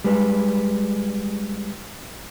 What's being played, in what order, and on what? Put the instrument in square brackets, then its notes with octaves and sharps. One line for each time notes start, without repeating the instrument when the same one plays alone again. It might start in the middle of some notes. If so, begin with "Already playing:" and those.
[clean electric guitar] G3 G#3 B4